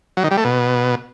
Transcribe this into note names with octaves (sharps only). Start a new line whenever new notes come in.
F#3
D#3
G3
A3
B2